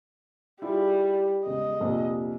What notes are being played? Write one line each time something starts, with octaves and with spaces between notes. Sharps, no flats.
G3 E4 F4 G#4
E1 C#3 D#5
A#1 F2 C3